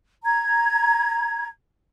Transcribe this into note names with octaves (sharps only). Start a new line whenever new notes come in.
A#5 G#6